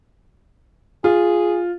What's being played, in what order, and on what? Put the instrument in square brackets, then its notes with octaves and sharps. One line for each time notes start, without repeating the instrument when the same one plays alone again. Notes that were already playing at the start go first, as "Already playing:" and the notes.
[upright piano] F4 [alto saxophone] G#4